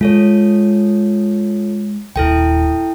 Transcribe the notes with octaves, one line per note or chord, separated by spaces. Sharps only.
G#3 F4 A4 C#5
D#1 G#1 E4 A4 G5